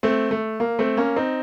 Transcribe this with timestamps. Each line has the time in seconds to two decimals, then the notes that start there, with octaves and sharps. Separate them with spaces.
0.03 A3 C4
0.31 A3
0.60 A#3
0.79 A3 C4
0.97 A#3 C#4
1.16 C4 D#4